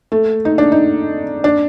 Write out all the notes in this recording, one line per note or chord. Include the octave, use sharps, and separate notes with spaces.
A3
D#4
D4
D#4
D4